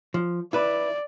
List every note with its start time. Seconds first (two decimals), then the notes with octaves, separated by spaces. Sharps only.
0.14 F3
0.53 E4 B4 D5